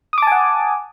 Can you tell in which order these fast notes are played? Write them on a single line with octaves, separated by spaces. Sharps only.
D#6 D6 A5 G#5 F#5